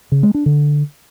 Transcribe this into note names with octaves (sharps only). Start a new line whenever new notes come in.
C#3
G#3
D4
D3